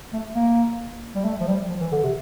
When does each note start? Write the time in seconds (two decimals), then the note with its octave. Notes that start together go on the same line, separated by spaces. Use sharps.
0.13 A3
0.35 A#3
1.15 G3
1.25 A3
1.41 F3
1.47 G3
1.70 F3
1.81 E3
1.92 D3
2.04 C3